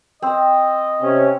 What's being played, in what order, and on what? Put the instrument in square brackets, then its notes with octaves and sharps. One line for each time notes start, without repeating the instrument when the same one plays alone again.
[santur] C4 [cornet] D#5
[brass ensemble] C3 C#4